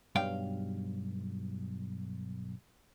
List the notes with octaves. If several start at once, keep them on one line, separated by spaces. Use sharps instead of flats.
B1 G2 F5 G5